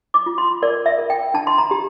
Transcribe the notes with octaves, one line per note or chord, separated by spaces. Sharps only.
D6
F4
C6
A#4 D5
E5
A#4
G5
D4 A5
C6
A#5
G4